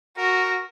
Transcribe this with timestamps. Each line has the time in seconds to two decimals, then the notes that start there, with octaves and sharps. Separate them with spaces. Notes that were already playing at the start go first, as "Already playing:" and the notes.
0.17 F#4 A#4